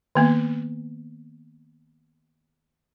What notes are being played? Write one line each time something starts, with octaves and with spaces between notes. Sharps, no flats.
D#3 A#3 B3